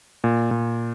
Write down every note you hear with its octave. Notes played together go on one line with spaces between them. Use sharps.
A#2
A#2